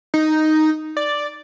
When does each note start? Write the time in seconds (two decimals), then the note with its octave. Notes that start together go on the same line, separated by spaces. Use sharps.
0.14 D#4
0.97 D5